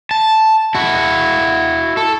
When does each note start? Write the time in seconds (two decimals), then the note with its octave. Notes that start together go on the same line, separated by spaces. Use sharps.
0.11 A5
0.75 E4 F#4
1.97 A4